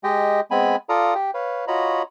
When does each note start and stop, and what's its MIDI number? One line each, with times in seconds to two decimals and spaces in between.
0.04 0.40 56
0.04 0.40 67
0.04 0.40 75
0.04 0.40 79
0.51 0.76 56
0.51 0.76 59
0.51 0.76 60
0.51 0.76 80
0.51 0.76 83
0.89 1.14 65
0.89 1.14 69
0.89 1.14 74
0.89 1.14 77
0.89 1.14 82
0.89 1.14 87
1.15 1.31 67
1.15 1.31 79
1.34 1.65 71
1.34 1.65 73
1.34 1.65 77
1.68 2.02 65
1.68 2.02 66
1.68 2.02 73
1.68 2.02 75
1.68 2.02 82
1.68 2.02 83